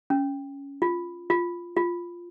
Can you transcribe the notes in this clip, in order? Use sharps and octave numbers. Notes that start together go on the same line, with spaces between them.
C#4
F4
F4
F4